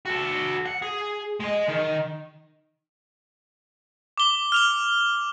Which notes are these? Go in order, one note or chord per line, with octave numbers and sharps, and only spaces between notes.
F#4 A4
F#5
G#4
G#3 D#5
D#3
D6 G7
F6 F7 G7